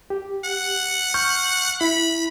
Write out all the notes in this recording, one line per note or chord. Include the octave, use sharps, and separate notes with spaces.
G4
F#5
C#6 F6 G6
E4 B5